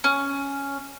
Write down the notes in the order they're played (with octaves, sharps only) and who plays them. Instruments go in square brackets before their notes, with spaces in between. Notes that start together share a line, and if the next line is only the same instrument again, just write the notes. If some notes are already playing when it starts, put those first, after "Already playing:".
[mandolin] C#4